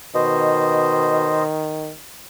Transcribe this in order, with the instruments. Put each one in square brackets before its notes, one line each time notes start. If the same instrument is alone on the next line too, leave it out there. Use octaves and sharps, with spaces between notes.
[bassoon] B2 [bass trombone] D#3 [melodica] C5 D#5